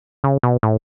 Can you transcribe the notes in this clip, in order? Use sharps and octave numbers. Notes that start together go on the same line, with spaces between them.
C#3
B2
A2